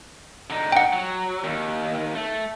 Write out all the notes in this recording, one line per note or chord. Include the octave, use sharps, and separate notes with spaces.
D3 D#4
F#5 G5
F#3
D#2 D#3
A3